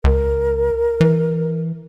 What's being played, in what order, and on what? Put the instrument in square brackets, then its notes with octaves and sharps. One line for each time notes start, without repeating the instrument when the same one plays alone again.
[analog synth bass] C#2 [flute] A#4
[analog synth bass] E3